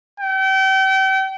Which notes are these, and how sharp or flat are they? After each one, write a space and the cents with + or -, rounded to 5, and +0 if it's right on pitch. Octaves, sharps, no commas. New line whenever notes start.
G5 -35